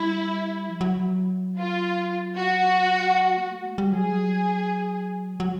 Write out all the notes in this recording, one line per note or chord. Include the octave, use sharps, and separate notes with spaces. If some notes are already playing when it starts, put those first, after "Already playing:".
Already playing: G3 E4
F3
F#3
F4
F#4
A#3
A3
G#3
G3
F#3 G#4
F#3